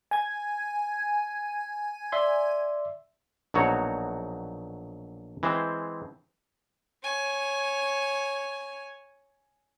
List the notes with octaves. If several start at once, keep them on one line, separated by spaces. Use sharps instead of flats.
G#5 G#6
D5 E5 C6
A#1 B2 F#3 D#4 F#4 C#5
E3 G#3 C4 C5
C#5 G#5